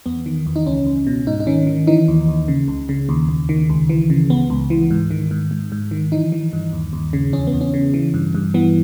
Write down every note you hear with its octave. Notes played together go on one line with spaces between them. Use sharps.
E2 B3
D#3
E2
D#4
C#2 C#4
C#2
B2
G#2 D#4
D#4
D#3 C#4
D#3
E3 D#4
D#2
D#2
C#3
C#2
C#3
D#2
D#2
D#3
C#2
E3
C#3
C#2 B3
C#2
E3
G#2
D#3
G#2
G#2
G#2
D#3
E3 D#4
E3
G2
D#2
D#2
C#3
E2 C#4
B3
E2
C#4
C#3
E3
G2
G2
E3 B3